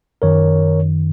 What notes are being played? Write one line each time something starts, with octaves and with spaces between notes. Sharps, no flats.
F#2 D#3 A#4 C#5